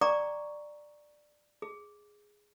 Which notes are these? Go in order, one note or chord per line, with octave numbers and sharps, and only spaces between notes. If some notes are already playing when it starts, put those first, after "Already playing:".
D5 G5 A#5 C#6 D6
G#4